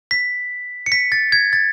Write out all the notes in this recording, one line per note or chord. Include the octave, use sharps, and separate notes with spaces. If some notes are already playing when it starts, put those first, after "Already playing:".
B6
C#7
B6
A6
G#6
A6